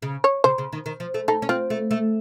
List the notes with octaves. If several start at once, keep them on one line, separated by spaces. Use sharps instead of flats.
C#3
C#5
C#3 C5
C#3
D#3
D#3
F3
A3
D#4 A4
C#4
C4 F4
A3
A3